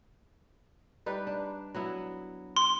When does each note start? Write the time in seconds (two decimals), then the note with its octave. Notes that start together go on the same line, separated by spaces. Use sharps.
1.06 G3 D#4 B4
1.27 D4
1.75 F#3 B3 E4
2.56 C6